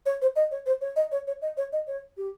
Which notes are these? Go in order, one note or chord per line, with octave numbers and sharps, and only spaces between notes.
C#5
C5
D#5
C#5
C5
C#5
D#5
C#5
C#5
D#5
C#5
D#5
C#5
G4